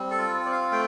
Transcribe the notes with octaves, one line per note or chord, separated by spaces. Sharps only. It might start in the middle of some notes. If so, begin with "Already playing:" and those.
Already playing: G3 C4
A4
F4
C4 D5
F5
A3 G5